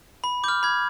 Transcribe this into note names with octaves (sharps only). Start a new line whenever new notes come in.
B5
D6 F6 G6
B5 G#6